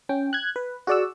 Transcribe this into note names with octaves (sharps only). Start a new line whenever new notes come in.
C#4 G5
F#6 G#6
B4
F#4 G#4 D5 F#5 E6